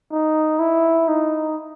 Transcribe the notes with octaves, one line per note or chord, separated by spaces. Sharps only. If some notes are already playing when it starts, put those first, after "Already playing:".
D#4
E4
D#4